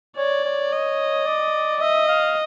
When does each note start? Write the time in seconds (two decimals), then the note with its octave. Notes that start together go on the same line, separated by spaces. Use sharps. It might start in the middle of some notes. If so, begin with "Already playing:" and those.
0.17 C#5 D5
0.45 C#5
0.72 D#5
1.26 D5
1.81 D#5 E5
2.08 F5